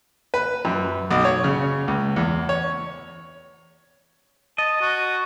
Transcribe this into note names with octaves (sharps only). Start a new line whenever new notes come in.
B4
F#2
B1
C#5
C#3
C#2
E2
C#5
D#5 A5
F#4